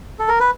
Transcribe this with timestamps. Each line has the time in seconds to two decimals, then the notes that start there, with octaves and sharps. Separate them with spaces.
0.19 A4
0.29 A#4
0.40 B4